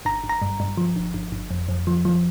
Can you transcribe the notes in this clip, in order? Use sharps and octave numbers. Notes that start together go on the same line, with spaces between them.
G1 A#5
G1
A#5
G2
G2
F3
G1
G1
G1
F2
F2
F3
F3